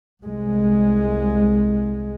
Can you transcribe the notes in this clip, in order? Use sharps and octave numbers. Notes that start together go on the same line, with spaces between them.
C2 G#3